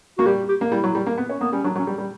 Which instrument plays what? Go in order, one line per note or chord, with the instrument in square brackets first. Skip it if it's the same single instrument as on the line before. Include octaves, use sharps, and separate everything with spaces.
[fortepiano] A#3 [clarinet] F#4
[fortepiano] G3 [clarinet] G4
[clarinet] G4
[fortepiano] A#3
[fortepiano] G3 [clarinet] E4
[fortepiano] F#3
G3
A#3
B3
C#4
[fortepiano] A#3 [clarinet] B3
[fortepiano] G3 [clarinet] C#4
[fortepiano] F#3 [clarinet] D4
[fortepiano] F#3
[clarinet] C#4
[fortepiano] G3
G3